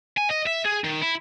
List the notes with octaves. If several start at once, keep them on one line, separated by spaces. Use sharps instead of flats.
G#5
D#5
E5
G#4
D#3
E4